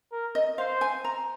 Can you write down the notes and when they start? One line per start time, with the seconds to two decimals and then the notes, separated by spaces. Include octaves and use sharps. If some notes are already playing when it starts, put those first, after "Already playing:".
0.12 A#4
0.35 D#5
0.58 C5 F5
0.81 G#5
1.04 A#5